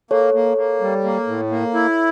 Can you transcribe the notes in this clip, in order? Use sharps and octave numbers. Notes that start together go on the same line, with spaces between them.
A#3 A4 C#5
A#3
A#3
G3
A#3
A2
A#3
E4